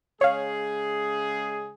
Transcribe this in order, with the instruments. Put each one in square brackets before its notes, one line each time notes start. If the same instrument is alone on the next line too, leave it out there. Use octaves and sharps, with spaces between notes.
[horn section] C#3 G#3 G#4 [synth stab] C#5 F5